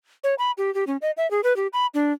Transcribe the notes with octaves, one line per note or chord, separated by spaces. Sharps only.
C#5
B5
G4
G4
C#4
D#5
E5
G#4
B4
G4
B5
D4